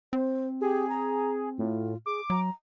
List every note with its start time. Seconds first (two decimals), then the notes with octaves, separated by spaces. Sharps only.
0.13 C4 C5
0.61 G4 G#4
0.89 A#5
1.58 A2 F4
2.06 G#4 D6
2.30 F#3 A#5